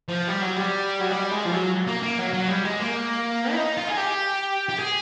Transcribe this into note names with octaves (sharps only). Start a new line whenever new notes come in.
F3
G3
F#3
G3
F#3
G3
G#3
F3
F#3
A#3
A#3
F#3
F#3
G3
G#3
A#3
E4
D#4
F4
G#4
G4
G4
G#4